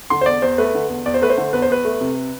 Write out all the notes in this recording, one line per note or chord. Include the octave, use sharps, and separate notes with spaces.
D3 C6
C5
E2 D5
E2 C5
A3 B4
D3
E2
E2 D5
C5
A3 B4
C5
D3
E2 B4
C5
E2 B4
A3
C3